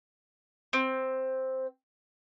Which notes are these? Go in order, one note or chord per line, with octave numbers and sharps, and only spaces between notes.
C4